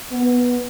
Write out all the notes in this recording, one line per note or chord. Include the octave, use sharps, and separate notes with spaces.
B3